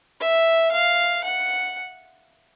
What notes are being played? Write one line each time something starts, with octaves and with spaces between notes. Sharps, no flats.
E5
F5
F#5